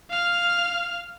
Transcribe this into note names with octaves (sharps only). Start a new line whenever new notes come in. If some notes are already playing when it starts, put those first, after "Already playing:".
F5 F6